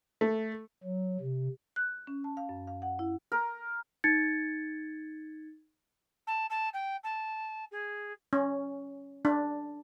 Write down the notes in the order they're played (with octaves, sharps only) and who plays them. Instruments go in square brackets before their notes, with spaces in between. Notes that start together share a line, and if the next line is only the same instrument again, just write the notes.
[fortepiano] A3
[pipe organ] F#3
C3
[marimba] F#6
C#4
A5
F5
F#2
F5
F#5
E4
[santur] A#4
[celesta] D#4 G#6 A6 C#7
[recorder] A5
A5
G5
A5
G#4
[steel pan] C#4
D4